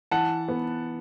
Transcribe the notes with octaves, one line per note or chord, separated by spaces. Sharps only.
E3 F#5 A5
B3